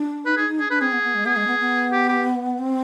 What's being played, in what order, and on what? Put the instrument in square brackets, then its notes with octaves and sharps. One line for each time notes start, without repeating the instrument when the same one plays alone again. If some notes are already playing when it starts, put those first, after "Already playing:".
Already playing: [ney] D4
[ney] D#4 [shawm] B4
[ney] D#4 [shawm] G#4
[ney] D#4
[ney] D4 [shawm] G#4
[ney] D4 [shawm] B4
[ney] C4 [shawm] G#4
[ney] B3
B3
G#3
[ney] B3 [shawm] G#4
[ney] G#3
B3
B3
[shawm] G4
G4
[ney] C4